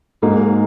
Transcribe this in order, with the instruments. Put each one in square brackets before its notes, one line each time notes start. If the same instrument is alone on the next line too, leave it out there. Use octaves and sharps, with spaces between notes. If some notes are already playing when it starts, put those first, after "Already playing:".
[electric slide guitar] G#2 [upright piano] F#3 A#3 D#4